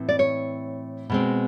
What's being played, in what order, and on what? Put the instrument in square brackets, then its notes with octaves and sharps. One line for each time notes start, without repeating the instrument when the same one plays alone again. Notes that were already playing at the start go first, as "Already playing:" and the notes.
Already playing: [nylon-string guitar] A2 E3 C4
D5
C#5
B2 G#3 C4